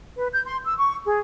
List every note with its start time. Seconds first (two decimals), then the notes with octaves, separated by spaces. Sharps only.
0.17 B4
0.33 G6
0.45 C6
0.64 E6
0.78 C#6
1.05 G#4